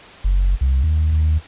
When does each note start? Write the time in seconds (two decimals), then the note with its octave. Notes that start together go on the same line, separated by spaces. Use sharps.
0.24 F#1
0.61 C2
0.84 D#2
1.12 D#2